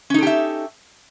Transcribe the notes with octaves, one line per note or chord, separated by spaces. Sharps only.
C#4 D#4 G4 A4 E5